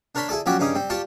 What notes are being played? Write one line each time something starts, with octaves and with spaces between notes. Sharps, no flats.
D4 A#4 C#5 A5 B5 C6
E4 G#4 A4 D5
F3 F#3 C#4 F#4 G4 D5
G2 C#3 C#4 D#4 D6 D#6
G3 C4
F4 G4 D5 A5 C#6